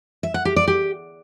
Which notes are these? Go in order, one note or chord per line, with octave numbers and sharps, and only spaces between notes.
E5
F#5
G4
D5
G4